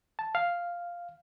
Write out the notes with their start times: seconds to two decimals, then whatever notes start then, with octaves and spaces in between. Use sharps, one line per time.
0.19 A5
0.35 F5